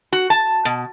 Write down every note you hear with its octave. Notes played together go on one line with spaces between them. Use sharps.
F#4
A5
B2